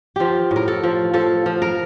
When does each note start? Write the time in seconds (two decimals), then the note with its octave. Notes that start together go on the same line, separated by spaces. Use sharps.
0.16 F3 F4 G4
0.51 A2
0.56 A#4
0.68 A4
0.83 F3
1.14 F3 A4
1.46 F3
1.62 A#4